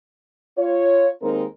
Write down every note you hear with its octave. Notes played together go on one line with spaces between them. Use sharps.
F4 C#5
D#2 G#3 C4 D#4 A#4